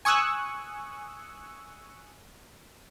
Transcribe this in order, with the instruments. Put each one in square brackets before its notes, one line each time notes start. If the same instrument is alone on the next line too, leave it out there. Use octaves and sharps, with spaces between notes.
[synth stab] G#5 C#6 D#6 E6 F#6